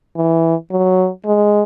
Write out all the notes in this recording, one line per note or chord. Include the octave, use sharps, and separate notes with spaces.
E3
F#3
G#3